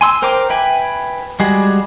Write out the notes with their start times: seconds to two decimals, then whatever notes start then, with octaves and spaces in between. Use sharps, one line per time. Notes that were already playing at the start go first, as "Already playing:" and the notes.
0.01 G#5 C6 E6
0.22 A#4 C5 G5 A#5 D6
0.50 B4 E5 G5 G#5
1.40 G3 G#3 F#4 G#4